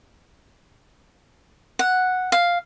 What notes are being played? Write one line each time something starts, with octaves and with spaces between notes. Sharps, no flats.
F#5
F5